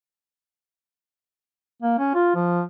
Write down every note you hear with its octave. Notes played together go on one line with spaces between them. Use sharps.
A#3
C#4
F4
F3